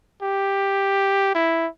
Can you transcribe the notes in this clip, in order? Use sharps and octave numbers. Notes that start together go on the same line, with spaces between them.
G4
E4